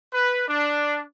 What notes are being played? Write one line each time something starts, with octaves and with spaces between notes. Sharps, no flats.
B4
D4